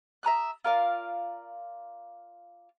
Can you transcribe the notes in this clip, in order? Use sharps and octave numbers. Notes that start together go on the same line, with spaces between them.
E5 A#5 D#6 F#6
F4 A#4 D5 F5